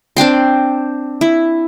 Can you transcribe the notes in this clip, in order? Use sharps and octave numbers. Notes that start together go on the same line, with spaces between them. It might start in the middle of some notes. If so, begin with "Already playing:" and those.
C4 D4 G5 C6
E4